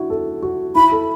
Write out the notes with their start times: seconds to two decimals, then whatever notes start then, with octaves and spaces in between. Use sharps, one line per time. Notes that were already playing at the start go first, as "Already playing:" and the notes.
Already playing: D4 E4 F#4
0.10 A4
0.42 F#4
0.75 E4 B5
0.91 A4